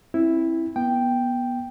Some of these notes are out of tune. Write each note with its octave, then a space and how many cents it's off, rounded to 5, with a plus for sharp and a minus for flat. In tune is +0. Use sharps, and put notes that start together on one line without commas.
C4 +25 E4 +0
B3 -25 G5 +0